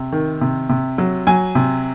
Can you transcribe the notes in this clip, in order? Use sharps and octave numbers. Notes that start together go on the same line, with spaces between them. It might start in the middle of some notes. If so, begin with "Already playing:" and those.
Already playing: C3
D#3
C3
C3
F#3
F#3 G#5
C3